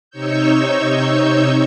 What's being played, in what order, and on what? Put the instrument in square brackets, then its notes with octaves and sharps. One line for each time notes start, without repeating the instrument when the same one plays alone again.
[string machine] C3 D#4 C#5 C#6 E6 G6